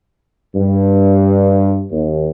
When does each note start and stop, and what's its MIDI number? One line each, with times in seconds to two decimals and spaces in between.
0.55 1.83 43
1.91 2.30 39